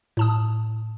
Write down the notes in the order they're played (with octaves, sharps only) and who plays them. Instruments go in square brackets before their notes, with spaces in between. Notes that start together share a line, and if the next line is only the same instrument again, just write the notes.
[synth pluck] A2 A5 D#6